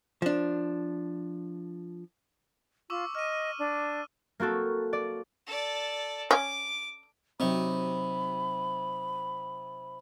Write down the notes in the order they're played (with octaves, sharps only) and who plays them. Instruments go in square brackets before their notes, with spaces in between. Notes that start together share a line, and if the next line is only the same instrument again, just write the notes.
[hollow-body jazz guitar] F3 D4
[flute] F4 [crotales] C#6 D6 E6
[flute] D#5 [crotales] F6 D#7
[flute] D4
[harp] A#3 C4 F#4 A4
D5
[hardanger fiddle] A4 D5
[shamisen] C#4 [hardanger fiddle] D6
[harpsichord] C3 D#4 C#6 [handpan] F#3 C4 [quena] B5